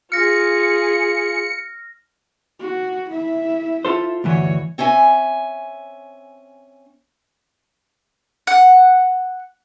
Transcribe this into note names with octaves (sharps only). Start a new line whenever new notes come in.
F4 G#4 F6 A#6 C#7
F#4
E4 E5
F4 A4 C5
D2 G2 E3 F#4 C#5
C4 C#4 E5 G#5
F#5